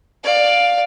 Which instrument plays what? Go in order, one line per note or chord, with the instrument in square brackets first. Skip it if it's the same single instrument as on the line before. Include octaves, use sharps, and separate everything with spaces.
[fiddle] D5 F5